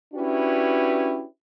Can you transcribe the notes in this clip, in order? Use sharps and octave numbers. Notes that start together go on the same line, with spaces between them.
C#4 D4 E4 F#4 G4 B4